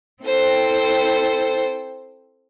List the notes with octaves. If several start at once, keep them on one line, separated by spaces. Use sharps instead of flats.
C4 E4 A4 C5 G5